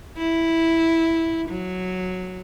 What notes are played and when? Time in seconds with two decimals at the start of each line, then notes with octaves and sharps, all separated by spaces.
0.17 E4
1.49 F#3